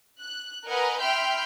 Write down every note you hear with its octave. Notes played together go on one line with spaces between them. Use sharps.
F#6
A#4 B4 D#5 F#5 G#5 A#5
E5 G5 B5 C6 F6 G6